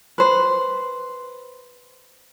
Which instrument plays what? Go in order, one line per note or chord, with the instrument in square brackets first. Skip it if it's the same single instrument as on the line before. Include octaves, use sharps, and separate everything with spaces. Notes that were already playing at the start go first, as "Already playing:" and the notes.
[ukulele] B4 C5